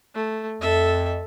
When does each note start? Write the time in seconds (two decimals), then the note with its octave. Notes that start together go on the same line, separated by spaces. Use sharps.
0.14 A3
0.61 F2 A4 E5